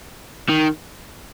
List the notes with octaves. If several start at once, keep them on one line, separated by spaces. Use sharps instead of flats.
D#3